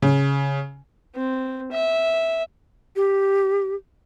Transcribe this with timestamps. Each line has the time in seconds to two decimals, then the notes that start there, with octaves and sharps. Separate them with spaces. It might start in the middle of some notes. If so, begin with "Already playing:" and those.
0.02 C#3
1.15 C4
1.72 E5
2.96 G4